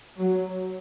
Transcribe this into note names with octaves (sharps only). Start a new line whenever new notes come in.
F#3